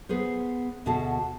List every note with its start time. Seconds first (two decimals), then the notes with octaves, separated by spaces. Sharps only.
0.09 B3 G#4 B4 C5
0.86 D2 B2 F#4 G#4 A5